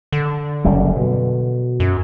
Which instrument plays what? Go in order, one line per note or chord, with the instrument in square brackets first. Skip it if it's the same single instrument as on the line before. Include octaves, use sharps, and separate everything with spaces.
[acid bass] D3
[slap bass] F#1 F#2 G3
B2
[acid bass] F#2